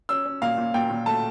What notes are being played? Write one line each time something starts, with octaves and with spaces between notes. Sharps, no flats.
C#4 E6
C#4
A#2 F5
A#2
A#2 G5
A#2
A3 A5